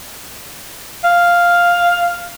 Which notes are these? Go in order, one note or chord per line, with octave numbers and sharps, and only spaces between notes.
F5